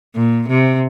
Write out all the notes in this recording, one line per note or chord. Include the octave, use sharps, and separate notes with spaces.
A#2
C3